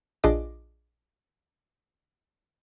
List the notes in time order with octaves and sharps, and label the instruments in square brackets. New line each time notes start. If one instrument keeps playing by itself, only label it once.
[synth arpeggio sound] A#1 D4 F4 G#4 D#5 D6